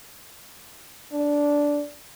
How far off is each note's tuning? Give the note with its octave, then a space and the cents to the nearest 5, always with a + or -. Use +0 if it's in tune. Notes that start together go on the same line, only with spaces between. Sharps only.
D4 -10